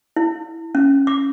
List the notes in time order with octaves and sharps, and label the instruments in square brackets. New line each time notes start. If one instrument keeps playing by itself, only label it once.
[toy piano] E4
C#4
D6